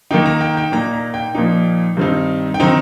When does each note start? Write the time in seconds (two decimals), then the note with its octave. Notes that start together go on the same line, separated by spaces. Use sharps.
0.11 D#3 A#3 D#4 G5
0.26 A#5
0.41 G5
0.57 G5
0.72 A#2 A#3 D#4 A#5
0.94 A#5
1.14 G5
1.35 A#2 F3 A#3 D#4
1.97 G2 D#3 C4 D#4
2.54 G5
2.60 D#3 C4 D#4 A#5